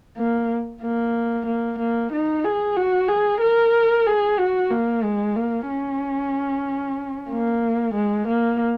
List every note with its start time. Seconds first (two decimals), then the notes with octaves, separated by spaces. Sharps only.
0.17 A#3
0.82 A#3
1.46 A#3
1.79 A#3
2.12 D#4
2.44 G#4
2.77 F#4
3.08 G#4
3.41 A#4
4.07 G#4
4.39 F#4
4.71 A#3
5.03 G#3
5.36 A#3
5.69 C#4
7.30 A#3
7.94 G#3
8.28 A#3